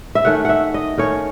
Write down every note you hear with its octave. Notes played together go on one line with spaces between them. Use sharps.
E5
D#3 A3 C#4 F#5
E5 F#5
D#5
D#3 A3 C#4 C#5